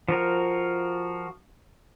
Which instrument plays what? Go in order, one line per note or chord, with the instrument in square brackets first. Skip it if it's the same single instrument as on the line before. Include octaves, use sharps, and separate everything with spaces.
[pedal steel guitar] F3 F#4 A#4